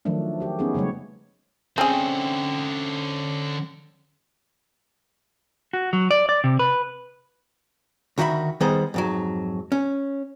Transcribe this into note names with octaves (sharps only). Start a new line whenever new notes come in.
D#3 F3 F#3 A3 D4
F#4 G4
B3 C#4 D#4 G#4
C#3 F#3 G3 A3 C#5
D3 C4 C#4 G#4 C5 G5
F#4
F#3
D5
D5
C3
B4
D2 D#3 F#4 E5 B5
D#3 G3 B3 G#4 C5 D#5
F2 G#2 F#3
C#4